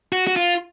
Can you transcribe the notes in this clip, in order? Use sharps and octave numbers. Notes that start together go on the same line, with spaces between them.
F#4
F#4
F4